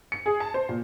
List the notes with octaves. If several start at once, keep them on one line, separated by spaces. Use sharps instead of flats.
C#7
G#4
A5
C5
A#2